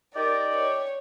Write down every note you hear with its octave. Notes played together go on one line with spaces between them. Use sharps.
D#4 G4 A#4 D5
C#5